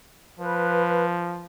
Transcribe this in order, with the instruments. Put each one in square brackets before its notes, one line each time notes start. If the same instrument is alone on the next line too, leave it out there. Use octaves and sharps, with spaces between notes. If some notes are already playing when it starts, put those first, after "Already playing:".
[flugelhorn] F3 [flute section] B4